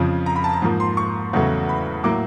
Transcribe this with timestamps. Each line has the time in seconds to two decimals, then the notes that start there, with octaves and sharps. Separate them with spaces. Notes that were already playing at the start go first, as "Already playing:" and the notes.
Already playing: F2 C#3 F3
0.26 A#5
0.36 B5
0.44 A5
0.53 A#5
0.62 G#2 F3 A#3
0.80 C6
0.97 C#6
1.33 E2 C#3 F#3 A3
1.69 B5
2.04 A2 F#3 A#3 D6